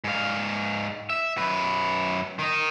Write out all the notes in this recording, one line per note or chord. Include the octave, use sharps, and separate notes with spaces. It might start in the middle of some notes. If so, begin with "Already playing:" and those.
G#2 F5
E5
F#2 B4
D#3 D#4